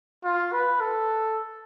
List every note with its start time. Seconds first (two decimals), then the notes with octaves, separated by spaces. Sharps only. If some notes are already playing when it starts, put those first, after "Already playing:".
0.24 F4
0.52 B4
0.80 A4